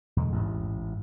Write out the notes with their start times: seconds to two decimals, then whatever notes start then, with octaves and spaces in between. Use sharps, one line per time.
0.16 E2 B2 D3 G#3
0.32 A1 G#2